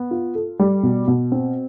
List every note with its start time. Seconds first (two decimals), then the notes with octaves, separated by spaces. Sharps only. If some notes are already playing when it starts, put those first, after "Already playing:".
Already playing: B3
0.11 F4
0.35 A4
0.59 G3
0.83 B2
1.07 B2
1.32 C4